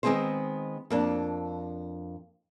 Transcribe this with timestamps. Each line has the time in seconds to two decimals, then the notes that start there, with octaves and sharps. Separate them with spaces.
0.03 D#3 G#3 B3 C4 G#4 C5
0.90 F2 A#3 D4